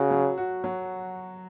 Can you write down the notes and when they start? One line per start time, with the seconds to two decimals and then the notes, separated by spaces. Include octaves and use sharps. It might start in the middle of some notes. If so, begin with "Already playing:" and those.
Already playing: C#3 F#4
0.11 F#3
0.38 F#4
0.64 F#3